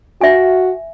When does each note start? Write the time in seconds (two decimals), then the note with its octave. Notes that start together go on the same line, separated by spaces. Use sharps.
0.21 F#4 E5 G#5